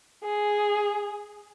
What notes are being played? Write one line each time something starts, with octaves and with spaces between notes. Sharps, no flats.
G#4